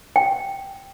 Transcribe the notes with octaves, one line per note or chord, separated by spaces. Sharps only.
G5